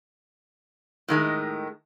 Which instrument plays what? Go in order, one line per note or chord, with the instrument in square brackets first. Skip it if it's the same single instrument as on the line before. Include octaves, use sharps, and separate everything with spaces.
[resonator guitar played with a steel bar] A2 D#3 G#3